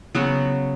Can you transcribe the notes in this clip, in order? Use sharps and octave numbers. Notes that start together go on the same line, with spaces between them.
C#3 F#3 B3 F#4